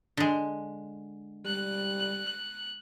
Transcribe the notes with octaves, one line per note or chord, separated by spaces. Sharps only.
D3 G#3
G3 F#6